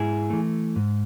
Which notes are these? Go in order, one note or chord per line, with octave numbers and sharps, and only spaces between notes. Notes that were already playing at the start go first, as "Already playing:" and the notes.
Already playing: G#2 E4 G#4
E3 A3
G#2